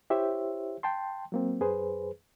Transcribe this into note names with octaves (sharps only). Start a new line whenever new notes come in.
E4 G4 C5 C#5 E5
G5 A5 C6
F#3 A#3 C4
F#2 G#4 B4 C5